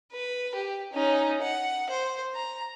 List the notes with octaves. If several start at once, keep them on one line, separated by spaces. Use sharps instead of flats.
B4
G4
C#4 D#4
F#5
C5
A#5